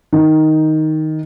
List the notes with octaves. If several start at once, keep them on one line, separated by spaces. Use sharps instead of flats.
D#3